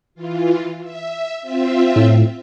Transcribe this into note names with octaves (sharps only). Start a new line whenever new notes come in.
E3 F4
E5
C4 F4 E5
A2